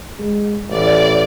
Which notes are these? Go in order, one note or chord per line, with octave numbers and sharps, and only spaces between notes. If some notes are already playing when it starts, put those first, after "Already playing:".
G#3
A1 D5